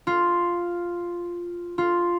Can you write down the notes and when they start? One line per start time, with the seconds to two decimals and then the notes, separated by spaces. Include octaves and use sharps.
0.07 F4
1.78 F4